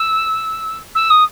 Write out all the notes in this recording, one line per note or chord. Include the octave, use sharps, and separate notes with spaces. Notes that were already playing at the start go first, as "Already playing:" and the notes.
Already playing: E6
E6
D#6